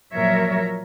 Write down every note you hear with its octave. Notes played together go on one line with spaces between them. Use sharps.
A#2 F3 F#3 A#4 C#5 E5